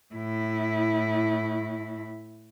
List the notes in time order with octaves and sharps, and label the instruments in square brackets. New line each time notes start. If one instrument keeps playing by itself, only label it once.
[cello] A2 E4